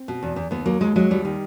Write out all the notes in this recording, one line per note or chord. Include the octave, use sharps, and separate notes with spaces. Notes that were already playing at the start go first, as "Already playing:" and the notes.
Already playing: C4
B2
E2
E2
D#2 B3
F#3 A#3
D#2 G#3
F#3 G#3
D#2 G3
D#3